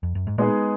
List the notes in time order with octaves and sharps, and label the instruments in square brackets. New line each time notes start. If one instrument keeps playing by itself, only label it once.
[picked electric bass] F2
F#2
G#2
[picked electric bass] A#2 [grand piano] G#3 B3 D#4 G#4